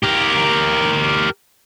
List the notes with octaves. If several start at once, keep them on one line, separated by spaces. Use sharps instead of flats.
G4 A#4